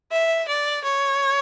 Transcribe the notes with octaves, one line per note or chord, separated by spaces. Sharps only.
E5
D5
C#5